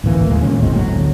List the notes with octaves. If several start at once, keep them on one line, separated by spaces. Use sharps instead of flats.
D1 A1 E3 A#3
D#2 G#3 A#3
D2 A#2 F3 C#4
G1 A2 G#3 C4
G1 D2 F#3